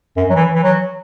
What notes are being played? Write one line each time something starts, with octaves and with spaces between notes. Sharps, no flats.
F#2
F#3
E3
E3
F#3